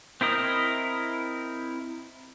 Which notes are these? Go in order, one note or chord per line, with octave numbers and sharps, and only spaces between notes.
C4 E4 A#4 D#5